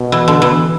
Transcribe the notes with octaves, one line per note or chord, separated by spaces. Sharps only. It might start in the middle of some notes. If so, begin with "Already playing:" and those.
Already playing: B2
E3
D3
E3